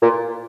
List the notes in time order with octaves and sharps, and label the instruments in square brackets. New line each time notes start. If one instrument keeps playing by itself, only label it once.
[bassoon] A#2